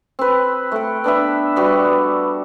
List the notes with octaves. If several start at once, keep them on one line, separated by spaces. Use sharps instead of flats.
C4 B4
A3 G5
B3 D4 B4 E5
G3 B3 F#4